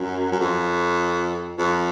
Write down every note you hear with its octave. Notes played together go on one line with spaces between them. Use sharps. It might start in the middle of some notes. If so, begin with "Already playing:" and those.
Already playing: F#2
F#2
F2
F2